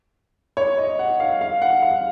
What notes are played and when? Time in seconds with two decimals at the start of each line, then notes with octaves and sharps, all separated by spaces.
0.57 C#5
0.78 D#5
0.99 F#5
1.20 F5
1.41 F5
1.62 F#5
1.82 F5